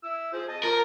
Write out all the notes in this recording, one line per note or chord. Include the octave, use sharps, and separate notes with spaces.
E4 E6
F3 G#4 C5
D#5 A5
F3 A#4 A5